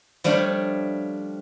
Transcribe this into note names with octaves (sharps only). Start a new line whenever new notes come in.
F3 G3 A3 D4 C#5